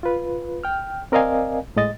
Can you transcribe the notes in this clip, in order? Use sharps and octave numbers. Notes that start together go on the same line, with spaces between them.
F4 B4
G5 F6
C4 A#4 D5 D#5 F5 G#5
A2 G#3 D#5 A6